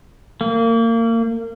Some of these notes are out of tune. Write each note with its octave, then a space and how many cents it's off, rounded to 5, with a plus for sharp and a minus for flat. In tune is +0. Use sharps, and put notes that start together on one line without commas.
A#3 -30